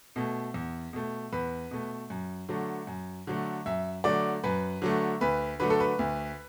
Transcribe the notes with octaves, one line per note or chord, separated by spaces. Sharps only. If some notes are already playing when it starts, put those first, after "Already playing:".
B2 A3
E2
B2 A3
E2 B4
B2 A3
F#2
D3 F#3 A3
F#2
D3 F#3 A3
F#2 E5
D3 F#3 A3 D5
F#2 B4
D3 F#3 A3
D2 B4
D3 F#3 A3 B4
A4
B4
D2